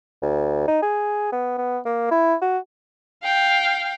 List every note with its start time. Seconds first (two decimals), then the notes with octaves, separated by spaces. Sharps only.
0.22 D2
0.68 D#4
0.82 G#4
1.32 B3
1.58 B3
1.86 A#3
2.11 E4
2.41 F#4
3.23 F5 G5